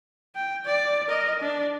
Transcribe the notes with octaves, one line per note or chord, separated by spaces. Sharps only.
G5
D5
A#4 D#5
D4